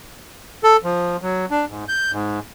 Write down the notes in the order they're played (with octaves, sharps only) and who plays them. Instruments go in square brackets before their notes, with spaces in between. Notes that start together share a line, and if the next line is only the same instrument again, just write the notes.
[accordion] A4
F3
F#3
D4
G#2
G6
G#2